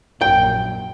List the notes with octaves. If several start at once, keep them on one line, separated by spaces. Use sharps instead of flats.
A#1 F#2 G5